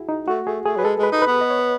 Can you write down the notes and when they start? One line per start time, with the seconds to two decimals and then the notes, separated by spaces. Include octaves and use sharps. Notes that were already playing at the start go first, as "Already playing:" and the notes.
Already playing: E4 F#4 G#4
0.09 D#4
0.28 A3 F#4
0.46 A3 G#4
0.65 A3 G#4
0.76 F#3 B4
0.84 G#3 A4
0.99 G#3 B4
1.12 D#4
1.22 B4
1.27 B3
1.41 D#5
1.50 C#5
1.59 B4